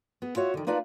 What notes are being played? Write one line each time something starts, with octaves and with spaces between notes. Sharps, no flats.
B3 G#4
F4 F#4 C#5 E5
D3 D#3
A#3 D#4 F4 B4 D5 A5